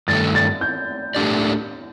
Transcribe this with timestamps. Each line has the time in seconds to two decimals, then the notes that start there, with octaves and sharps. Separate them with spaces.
0.08 G2 D#3 A3 A6
0.35 A6
0.61 G6
1.15 A2 A3 D4 G4 D5